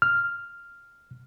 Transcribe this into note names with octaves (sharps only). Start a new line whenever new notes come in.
F6